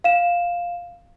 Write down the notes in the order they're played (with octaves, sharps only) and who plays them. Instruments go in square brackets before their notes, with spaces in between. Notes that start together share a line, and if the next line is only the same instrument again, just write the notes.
[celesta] F5 E7